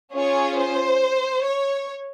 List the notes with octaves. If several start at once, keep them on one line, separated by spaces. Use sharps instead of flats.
C#4 F4 G#4 C#5
C5
C#5